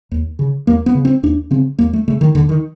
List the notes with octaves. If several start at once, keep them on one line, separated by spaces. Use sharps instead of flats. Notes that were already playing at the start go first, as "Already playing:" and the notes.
D#2
C#3
D#2 A#3
B3
C#3
C4
D#2 D4
C#3 C4
D#2 A#3
A3
C#3 A3
D#3
D#2 D3
D#3